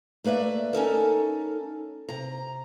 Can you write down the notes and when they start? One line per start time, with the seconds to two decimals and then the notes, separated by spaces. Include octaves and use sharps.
0.24 A3 A#3 B4 D5 E5
0.73 C#4 D#4 A4 A#4
2.09 C3 A#5